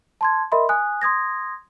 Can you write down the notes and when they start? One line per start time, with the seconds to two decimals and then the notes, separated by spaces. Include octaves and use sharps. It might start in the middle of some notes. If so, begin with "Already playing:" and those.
0.21 A5 C6 G#6
0.52 A#4 D#5 E5 B5 C6
0.69 G#5 D#6 F#6
1.02 C6 D#6 G#6 A#6